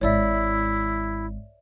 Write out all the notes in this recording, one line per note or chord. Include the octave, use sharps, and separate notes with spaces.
G#1 G#2 E4 C#5 D5 E5